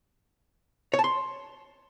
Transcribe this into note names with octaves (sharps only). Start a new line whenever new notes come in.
C#5
A5
C6